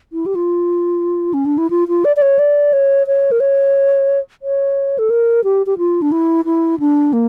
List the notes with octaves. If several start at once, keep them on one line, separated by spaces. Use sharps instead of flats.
E4
G4
F4
C#4
D4
E4
F4
F4
D5
D5
C#5
D5
C#5
C#5
A#4
C#5
C#5
A4
A#4
G4
G4
F4
D4
E4
E4
D4
A#3